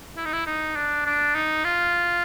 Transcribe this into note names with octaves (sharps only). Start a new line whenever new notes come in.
E4
D#4
E4
D#4
D4
D4
D#4
F4